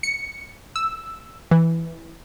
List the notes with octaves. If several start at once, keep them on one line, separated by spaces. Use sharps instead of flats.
C#7
E6
E3